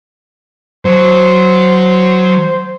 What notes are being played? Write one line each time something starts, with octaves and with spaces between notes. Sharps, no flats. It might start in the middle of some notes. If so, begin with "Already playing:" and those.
F#3 C5